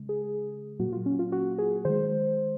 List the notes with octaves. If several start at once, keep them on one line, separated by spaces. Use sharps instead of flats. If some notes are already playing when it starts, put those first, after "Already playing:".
Already playing: C#3 G#3
G#4
A#2 F#3 A#3 F#4
F4
C#4
F4
F#4
G#4
D#3 G#3 C5